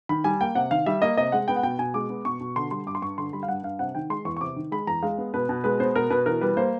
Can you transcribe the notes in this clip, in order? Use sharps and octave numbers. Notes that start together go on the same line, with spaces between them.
D#3 B5
G3 G#5
A#3 G5
C3 F#5
D#3 F5
G3 E5
A#3 D#5
C3 D#5
G#3 F#5
B3 G5
F#5
B2 G5
B2 G#5
G#3 D6
B3
B2 C#6
B2
D3 C6
G3 C6
G2 D6
C6
G2 C#6
D3 C6
G3 B5
F5
G2 F#5
G2 F5
C3 F#5
D#3 G5
G#3 C6
E2 C#6
C#6
C3 D6
D#3
G#3 B5
E2 A#5
G#3 F5
B3
B2 B4
B2
G#3 B4
B3 C5
B2 A#4
B2 B4
E3 A#4
G3 B4
A#3 C5